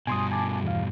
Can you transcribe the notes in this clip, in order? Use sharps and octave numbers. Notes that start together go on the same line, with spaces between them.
G2 B2 G#5 C6 D#6
G#5 A5 D6
E2 F5